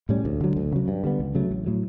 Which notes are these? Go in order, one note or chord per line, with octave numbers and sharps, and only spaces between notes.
A2 G3 C#4
D2
D3 F#3
D2
C#3 F#3
G2
D3 G3 B3
C#2
C#3 F#3 A3
A1
A2 F#3